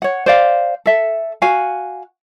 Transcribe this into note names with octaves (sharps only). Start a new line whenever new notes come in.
C#5 F#5
C5 D5 F5
A4 E5
F#4 F5 G#5